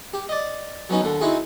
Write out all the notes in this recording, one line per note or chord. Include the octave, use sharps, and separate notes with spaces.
G4
D5 D#5
F#3 B3 C#4 D#4
D#2 D3
C4 D#4 E4 F#4 G#4